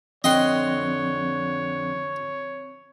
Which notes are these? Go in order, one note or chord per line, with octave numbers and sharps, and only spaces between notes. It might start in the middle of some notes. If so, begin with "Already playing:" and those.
F2 D3 C4 C#5 D#5 G5 C6 F#6